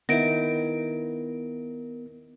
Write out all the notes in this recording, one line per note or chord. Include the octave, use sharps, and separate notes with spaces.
D#3 B3 E4 A#4 A#6 D7